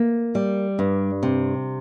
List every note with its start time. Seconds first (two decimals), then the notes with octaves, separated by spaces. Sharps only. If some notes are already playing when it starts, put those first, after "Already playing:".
Already playing: A#3
0.35 G3
0.79 G2
1.23 C3